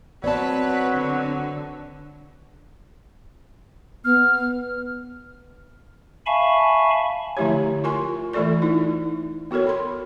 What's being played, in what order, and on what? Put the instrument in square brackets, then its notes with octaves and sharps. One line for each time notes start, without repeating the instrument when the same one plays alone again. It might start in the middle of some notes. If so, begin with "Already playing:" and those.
[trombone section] F#3 F#4 [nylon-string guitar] B3 C4 A5 [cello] B4 [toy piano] D5
[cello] D3
[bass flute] B3 [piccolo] F6
[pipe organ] E5 F5 G#5 A5 B5 C#6
[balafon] D3 F3 A3 E4 G4 C#5
F4 A#4 G#5 C6
E3 A3 F4 A4 D5 C#6
D#4 E4
B3 F#4 A4 A#4 C#5
B5 C6